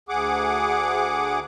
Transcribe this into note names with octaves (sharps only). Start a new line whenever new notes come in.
D2 G#4 F#5 D6